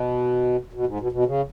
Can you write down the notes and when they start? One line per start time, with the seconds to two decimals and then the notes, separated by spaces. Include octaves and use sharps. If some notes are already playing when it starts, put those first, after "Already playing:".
Already playing: B2
0.73 B2
0.86 G#2
1.00 B2
1.12 B2
1.26 C#3